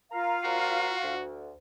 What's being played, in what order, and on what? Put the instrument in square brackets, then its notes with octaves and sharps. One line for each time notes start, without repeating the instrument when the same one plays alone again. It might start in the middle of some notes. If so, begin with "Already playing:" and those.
[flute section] F4 F5 [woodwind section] A#4 A#5
[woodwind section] A#2 C4 A#5 [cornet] F#4
[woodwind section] D2